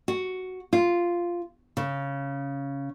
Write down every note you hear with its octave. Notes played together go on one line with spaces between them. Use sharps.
F#4
F4
C#3